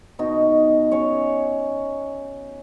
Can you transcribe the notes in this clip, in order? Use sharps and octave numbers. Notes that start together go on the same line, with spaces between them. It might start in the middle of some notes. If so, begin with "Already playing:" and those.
B2 D#4 F#4
C#4 C#5